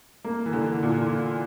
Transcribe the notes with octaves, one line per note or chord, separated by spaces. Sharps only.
A#3
E3
D3
A#2